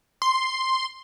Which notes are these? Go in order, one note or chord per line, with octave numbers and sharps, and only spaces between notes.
C6